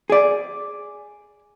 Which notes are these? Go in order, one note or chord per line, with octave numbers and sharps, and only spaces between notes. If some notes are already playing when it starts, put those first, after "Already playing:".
G#4 D5